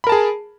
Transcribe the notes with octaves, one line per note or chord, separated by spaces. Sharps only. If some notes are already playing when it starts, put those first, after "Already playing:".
G#4 A#4 A5 B5